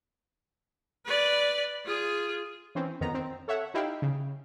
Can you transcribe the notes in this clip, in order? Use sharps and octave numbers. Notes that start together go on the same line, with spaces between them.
B4 D5
F4 G#4
E3 C4 C#4
F2 D#3 B3 A#5
C4
A4 C#5 E5 F#5
D#4 E4 G4 F5 G5
C#3